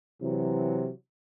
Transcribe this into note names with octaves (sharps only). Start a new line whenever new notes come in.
C3 E3 F#3